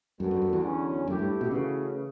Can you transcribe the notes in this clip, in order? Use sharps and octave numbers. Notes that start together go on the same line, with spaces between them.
F#2 G3 B3 F#4 A4
F#2
F#2
E2
D3 F#3 C#4
F#2 A3 E4 G4
G2
B2
C#3 E3 A3 C#4 F#4 B4